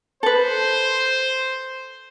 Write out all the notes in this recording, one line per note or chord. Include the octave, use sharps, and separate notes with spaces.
A4 B4 C5